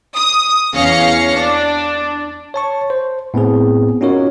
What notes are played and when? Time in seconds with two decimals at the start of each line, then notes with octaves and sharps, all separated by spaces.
0.15 D#6
0.74 E2 C#4 F5 A#6 C#7
1.37 D4
2.54 C#5 A5 C#6
2.90 C5
3.34 A2 B3 C4 G#4
4.01 C#4 D#4 F4 F#4 A#4 C#5